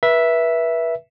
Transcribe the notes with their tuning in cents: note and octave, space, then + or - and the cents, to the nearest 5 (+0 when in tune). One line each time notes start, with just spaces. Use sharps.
B4 -30 E5 +0